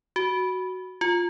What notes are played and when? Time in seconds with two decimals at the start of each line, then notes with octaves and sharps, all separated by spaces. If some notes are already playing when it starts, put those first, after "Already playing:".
0.16 F#4
1.01 F4